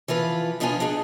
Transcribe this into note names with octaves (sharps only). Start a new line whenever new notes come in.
E3 F3 F4 B4
B2 F3 D4 D#4 F4 G#5
D4 D#4 G#4